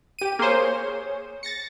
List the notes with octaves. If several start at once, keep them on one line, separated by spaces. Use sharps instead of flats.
G4 D#7
A#3 G#4 C5 C#5
A6 A#6 C#7